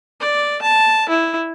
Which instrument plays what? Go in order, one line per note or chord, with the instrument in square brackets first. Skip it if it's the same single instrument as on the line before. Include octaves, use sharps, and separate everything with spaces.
[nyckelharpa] D5
A5
E4